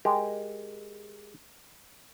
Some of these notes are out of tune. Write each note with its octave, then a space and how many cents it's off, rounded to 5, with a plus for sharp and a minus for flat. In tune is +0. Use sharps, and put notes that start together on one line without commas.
G#3 -5 G4 +0 A#4 +0